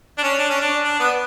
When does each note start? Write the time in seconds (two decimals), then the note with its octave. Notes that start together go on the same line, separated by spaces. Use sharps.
0.18 D4
0.23 C#4
0.38 D4
0.50 C#4
0.61 D4
0.84 D4
0.99 B3